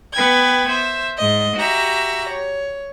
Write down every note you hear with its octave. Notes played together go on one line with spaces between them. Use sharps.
B3 B4 G5 G#6
C5 E5
G#2 D#5
F#4 G4 E5 A#5
C#5